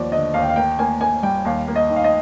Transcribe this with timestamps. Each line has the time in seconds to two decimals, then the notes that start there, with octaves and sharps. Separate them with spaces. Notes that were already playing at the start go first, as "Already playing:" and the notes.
Already playing: D#2 F3 D5
0.12 D3 D#5
0.34 D#2 F5
0.42 G5
0.49 F5
0.56 A#3 G5
0.79 A#3 G#5
1.01 A#3 G#5
1.23 G3 G5
1.45 D#2 F5
1.68 A#3
1.76 D#5
1.90 D#3
1.96 F5
2.04 D#5